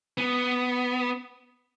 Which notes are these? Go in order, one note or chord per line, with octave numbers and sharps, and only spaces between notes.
B3